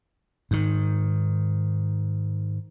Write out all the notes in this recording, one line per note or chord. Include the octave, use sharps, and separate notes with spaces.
G#2 D#3